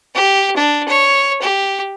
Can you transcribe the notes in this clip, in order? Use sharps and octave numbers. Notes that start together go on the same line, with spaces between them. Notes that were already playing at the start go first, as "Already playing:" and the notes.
G4
D4
C#5
G4